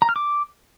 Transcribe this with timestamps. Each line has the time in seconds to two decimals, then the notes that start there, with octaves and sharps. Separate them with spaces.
0.02 A#5
0.09 F6
0.16 D6